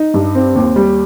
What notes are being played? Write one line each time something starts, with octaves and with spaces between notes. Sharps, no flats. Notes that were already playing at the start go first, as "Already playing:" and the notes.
Already playing: D#4
G2
C4
D#2
G3